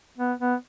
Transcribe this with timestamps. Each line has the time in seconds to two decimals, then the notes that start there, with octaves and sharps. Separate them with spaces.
0.18 B3
0.40 B3